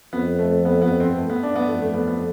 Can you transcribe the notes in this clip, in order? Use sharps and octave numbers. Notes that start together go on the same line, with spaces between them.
F2 B3
A3
B3
B3
C4
A3
B3
D4
B3
F2 A3
A3
B3
B3